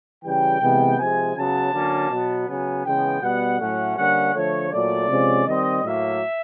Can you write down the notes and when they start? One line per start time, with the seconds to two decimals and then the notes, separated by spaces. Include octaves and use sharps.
0.24 C#3 E3 G3 G5
0.61 C3 E3 G#3 B3
0.99 C3 F3 G#3 G#5
1.35 C#3 F#3 B3 A5
1.73 D3 F#3 A#3 C#4
2.10 B2 F#3 B3
2.47 C#3 F#3 B3 G#5
2.85 C#3 E3 G#3 B3 G5
3.22 B2 G3 B3 F#5
3.59 A2 F#3 A3 C#4 F#5
3.96 D3 G3 A#3 C#4 F#5
4.34 D3 F3 A3 C#5
4.71 A#2 F#3 A3 D5
5.08 C3 F3 G#3 C#4
5.46 D#3 G3 C4 D#5
5.83 A2 F#3 A#3 E5